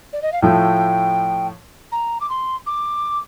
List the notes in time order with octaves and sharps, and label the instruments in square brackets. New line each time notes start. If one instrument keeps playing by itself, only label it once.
[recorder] D5
D#5
F5
[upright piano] A2 F3 A3 [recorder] G5
[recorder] A#5
D6
C6
D6